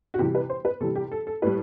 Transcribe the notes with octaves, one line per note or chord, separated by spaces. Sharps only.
F#4
C3 E3 G3 G4
B4
C5
B4
C3 E3 G3 A4
G4
A4
A4
A2 G3 B4